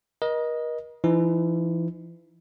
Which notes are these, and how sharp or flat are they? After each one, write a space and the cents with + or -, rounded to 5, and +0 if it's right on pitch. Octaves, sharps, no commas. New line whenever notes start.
A#4 +40 D#5 +0
E3 +35 D#4 +15